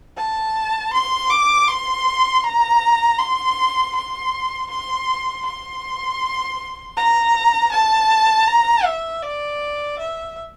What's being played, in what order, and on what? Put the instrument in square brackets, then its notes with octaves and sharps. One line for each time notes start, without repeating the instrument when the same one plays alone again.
[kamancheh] A5
C6
D6
C6
A#5
C6
C6
C6
C6
A#5
A5
A#5
E5
D5
E5